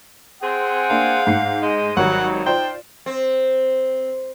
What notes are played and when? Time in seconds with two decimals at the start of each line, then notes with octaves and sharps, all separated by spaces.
0.42 C4 G#4 F#5
0.90 A#3 D4 F5
1.27 G#2 C7
1.62 G#3 D#5
1.97 G#1 D#3 F#3 G3 D#4 F#5
2.46 F4 C5 D5 G5
3.06 C4